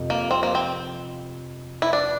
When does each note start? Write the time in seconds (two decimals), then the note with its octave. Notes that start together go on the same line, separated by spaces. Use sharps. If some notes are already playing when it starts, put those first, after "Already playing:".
Already playing: F2 C3
0.10 A#3
0.31 C4
0.43 A#3
0.55 C4
1.82 E4
1.93 D4